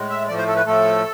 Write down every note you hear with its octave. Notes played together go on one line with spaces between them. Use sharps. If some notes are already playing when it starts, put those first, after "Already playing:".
Already playing: A2 G#3
E5
A2 F3 A3 D5
C5
A4
B4
A2 F3 A3 A4